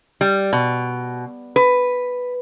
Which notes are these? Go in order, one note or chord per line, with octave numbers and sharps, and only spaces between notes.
G3
B2
B4